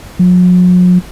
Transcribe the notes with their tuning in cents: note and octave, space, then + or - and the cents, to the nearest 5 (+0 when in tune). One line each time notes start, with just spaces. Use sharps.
F#3 -45